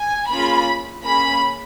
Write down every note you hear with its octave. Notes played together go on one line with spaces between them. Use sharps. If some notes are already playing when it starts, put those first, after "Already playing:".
Already playing: G#5
A#3 C#4 F4 G#4 B5
A#3 C#4 G#4 B5